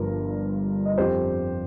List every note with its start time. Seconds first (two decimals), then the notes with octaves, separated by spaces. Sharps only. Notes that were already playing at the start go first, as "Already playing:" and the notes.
Already playing: G1 G2 F3 A#4
0.86 D#5
0.98 F2 F3 G4 C5